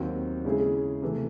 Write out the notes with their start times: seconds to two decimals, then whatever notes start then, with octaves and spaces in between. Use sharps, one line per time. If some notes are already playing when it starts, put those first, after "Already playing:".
Already playing: D#2 D#3 F#3 C4 F#4
0.45 C#3 G#3 C#4 E4 G#4
1.02 C3 E3 A3